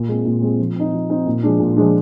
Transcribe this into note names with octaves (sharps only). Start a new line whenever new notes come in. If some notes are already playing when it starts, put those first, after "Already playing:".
Already playing: A#2
G#3 C4
A#2
G#3 C4
F3
C4 D#4
F3
C4 D#4
A#2
F3 G#3 D4
A#2
F3 G#3 D4